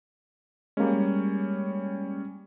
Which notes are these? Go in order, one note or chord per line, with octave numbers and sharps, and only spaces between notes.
G3 G#3 A#3 C#4